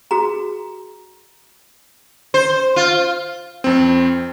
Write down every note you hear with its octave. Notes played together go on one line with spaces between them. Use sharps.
F#4 G#4 A#5
C5
F4
F2 C4